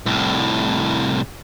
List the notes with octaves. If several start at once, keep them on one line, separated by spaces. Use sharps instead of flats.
C2 A2